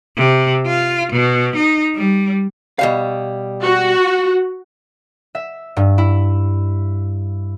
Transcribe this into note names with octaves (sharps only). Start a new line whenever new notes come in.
C3
F4
B2
D#4
G3
B2 G3 F5
F#4
E5
G2
E4